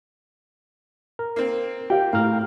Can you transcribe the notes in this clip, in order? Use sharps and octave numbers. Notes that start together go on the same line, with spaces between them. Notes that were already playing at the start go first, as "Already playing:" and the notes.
A#4
A#3 C4
G4 F5 G5
A2 F5 A#5 F6